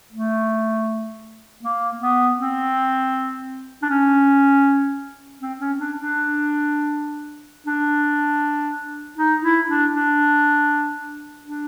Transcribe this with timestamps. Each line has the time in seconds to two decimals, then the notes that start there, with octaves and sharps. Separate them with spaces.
0.12 A3
1.63 A#3
2.01 B3
2.39 C4
3.82 D4
3.90 C#4
5.41 C4
5.60 C#4
5.79 D4
5.97 D4
7.67 D4
9.18 D#4
9.43 E4
9.68 D4
9.94 D4
11.44 D4